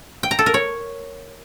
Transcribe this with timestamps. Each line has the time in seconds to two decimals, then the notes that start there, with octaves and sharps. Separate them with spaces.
0.23 G5
0.31 A#5
0.39 A4
0.46 A#4
0.54 C#5